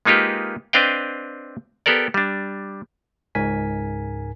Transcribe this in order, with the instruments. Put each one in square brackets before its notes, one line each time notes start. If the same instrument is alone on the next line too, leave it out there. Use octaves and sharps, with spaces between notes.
[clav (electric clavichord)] G#3 A#3 D#4 F4 G4 B4
C4 D4 B4 D#5 F5 G5
B3 G4 A4 A#4 D5
G3 D4
[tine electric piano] C#2 G#2 A#4 G#5 B6